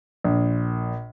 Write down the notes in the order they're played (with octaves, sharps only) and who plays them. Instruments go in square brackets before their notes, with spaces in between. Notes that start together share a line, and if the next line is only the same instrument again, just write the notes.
[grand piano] A#1